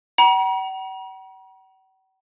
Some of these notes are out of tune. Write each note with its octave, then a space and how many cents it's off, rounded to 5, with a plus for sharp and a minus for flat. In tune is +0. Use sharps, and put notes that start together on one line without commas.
F#5 +45 A#5 +45